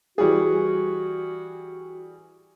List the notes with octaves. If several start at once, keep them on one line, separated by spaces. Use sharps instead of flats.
E3 G3 F#4 G#4